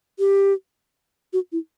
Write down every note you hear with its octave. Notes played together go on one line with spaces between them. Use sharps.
G4
F#4
E4